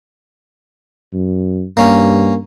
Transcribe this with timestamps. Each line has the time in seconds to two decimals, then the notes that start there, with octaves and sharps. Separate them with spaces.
1.13 F#2
1.77 G2 A#3 C#4